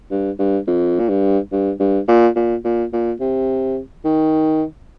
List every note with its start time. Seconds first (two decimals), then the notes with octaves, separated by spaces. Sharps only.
0.11 G2
0.39 G2
0.67 F2
0.99 A#2
1.09 G2
1.52 G2
1.80 G2
2.08 A#2
2.36 A#2
2.65 A#2
2.93 A#2
3.20 C3
4.05 D#3